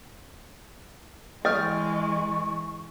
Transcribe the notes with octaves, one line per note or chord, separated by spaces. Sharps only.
E3 G#3 D#5 G5 C#6 D#6 F6